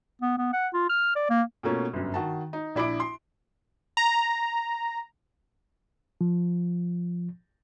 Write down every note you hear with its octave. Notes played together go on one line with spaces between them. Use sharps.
B3
B3
F#5
F4
F6
D5
A#3
B2 A3 A#3 C#4 F4
G1 F#2
D#3 F#4 A5
D#4
A#1 D4 E4 B5 D6 D7
C6
A#5
F3